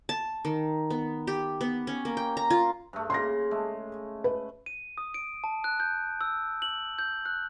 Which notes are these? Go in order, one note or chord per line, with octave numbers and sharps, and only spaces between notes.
A5
D#3
B3
G4
B3
C#4
A#3
G5
A#5
F4
G2 A3
C#3 A#3 C6 A#6
G#3 A3
B4
D#7
D#6
D7
A5
F#6
G6
E6
F#7
G6
F#6